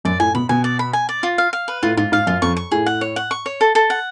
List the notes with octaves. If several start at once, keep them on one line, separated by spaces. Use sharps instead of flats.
F#2 D5
A2 G#5
B2 B5
B2 G#5
D5
B5
G#5
D5
F4
F5
F5
B4
A2 F4
G#2 F4
G#2 F5
F#2 F4
F2 C#6
C#6
A2 G#4
F#5
C#5
F#5
C#6
C#5
A4
A4
F#5